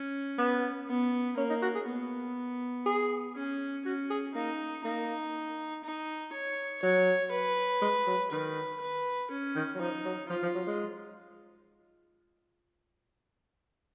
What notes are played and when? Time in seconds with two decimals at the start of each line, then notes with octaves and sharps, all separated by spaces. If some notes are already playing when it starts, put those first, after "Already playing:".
Already playing: C#4
0.38 B3
0.88 B3
1.38 A#3 C#4
1.50 D#4
1.62 F#4
1.75 G#4
1.87 B3
2.86 G#4
3.36 C#4
3.86 C#4 F#4
4.10 G#4
4.35 A#3 D#4
4.84 A#3 D#4
5.84 D#4
6.33 C#5
6.82 F#3 C#5
7.32 B4
7.82 G#3
8.07 F#3
8.31 D#3 B4
8.81 B4
9.31 C#4
9.55 D#3
9.75 F#3
9.80 F3 D#4
10.05 F#3
10.29 F3 F4
10.43 F3
10.55 F#3
10.67 G#3